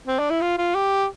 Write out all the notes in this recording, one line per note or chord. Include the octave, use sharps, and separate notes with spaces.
C4
D4
E4
F4
F4
G4